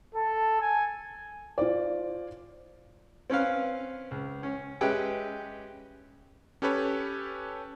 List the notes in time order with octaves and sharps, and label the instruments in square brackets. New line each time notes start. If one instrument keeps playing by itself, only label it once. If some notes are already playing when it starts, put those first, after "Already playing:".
[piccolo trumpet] A4
G#5
[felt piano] F4 C5 D5
[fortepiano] C4 C#4 B4 F5
C#2
C#4
G#3 C#4 G4 B4 E5 G5
[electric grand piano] C#4 G4 A4 B4 C#5